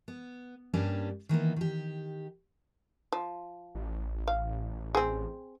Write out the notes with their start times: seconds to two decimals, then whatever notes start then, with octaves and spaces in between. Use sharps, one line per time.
0.08 B3
0.74 G2 G3 A#3 C#4 D4 G#5
1.29 D#3 E3 A#3 B3
1.56 D#3 G4
3.12 F3
3.75 A1
4.27 F5
4.95 C4 G#4